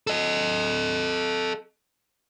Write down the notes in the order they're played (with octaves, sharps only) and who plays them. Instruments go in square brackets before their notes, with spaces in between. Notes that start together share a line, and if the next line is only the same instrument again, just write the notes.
[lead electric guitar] A4 D#5